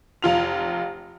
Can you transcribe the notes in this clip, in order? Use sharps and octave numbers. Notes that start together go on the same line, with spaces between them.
F1 F4 F7